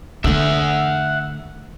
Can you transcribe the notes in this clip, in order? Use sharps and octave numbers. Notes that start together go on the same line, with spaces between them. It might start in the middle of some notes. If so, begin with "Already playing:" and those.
D3 A3 E5 F#5